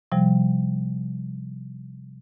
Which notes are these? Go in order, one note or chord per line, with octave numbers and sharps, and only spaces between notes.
C3 F3 G3